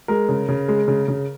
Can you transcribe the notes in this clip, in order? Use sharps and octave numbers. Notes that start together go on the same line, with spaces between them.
G#3 A#4
C#3
C#3
G#3
C#3
C#3